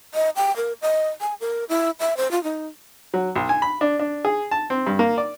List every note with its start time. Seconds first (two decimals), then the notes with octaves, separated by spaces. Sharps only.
0.14 D#5
0.36 G5
0.56 A#4
0.82 D#5
1.21 G#5
1.41 A#4
1.69 E4
2.00 E5
2.17 C5
2.31 F4
2.44 D#4
3.14 F#3
3.36 B1
3.49 G#5
3.62 B5
3.81 D4
4.00 D4
4.25 G#4
4.51 A5
4.70 C4
4.87 G2
4.99 A#3
5.18 D5